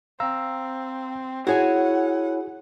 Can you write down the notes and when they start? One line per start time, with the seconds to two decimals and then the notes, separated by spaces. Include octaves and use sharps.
0.20 C4 F5 A#5 E6
1.47 E4 F#4 G#4 C#5 F#5 G#5